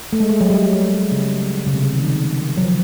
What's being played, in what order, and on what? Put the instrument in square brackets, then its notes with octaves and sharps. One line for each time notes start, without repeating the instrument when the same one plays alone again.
[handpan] A3
G#3
G#3
F#3
G3
C#3
C#3
C3
C#3
D#3
D#3
F#3
F3